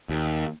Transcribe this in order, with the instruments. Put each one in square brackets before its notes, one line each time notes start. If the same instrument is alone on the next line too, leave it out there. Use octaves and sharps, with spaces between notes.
[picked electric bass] D#2